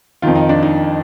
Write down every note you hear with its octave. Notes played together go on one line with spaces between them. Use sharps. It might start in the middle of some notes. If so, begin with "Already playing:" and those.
F2 D#3 F4
D#4
D4
D#4